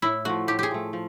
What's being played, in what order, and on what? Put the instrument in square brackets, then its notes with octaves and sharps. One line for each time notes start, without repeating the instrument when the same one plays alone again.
[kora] A2 [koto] E4
[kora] F3 A3 [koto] F#4
[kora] A2 [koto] G4
[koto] G4 G#4
[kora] F3 A3
F3